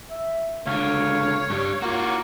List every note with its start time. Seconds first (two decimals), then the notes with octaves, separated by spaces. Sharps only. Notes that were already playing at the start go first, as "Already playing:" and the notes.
0.10 E5
0.67 C#2 D3 C#5 F5
1.50 G2 G3
1.82 A#3 F4 F#4